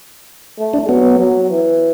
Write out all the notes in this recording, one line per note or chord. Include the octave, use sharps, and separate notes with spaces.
A3
D4
F#3 B3
F#3
E3